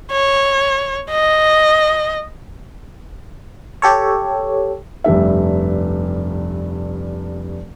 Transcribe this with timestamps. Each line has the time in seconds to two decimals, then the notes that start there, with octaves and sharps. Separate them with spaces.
0.12 C#5
1.11 D#5
3.82 G4 A4 C#5
5.04 F1 G2 G3 E5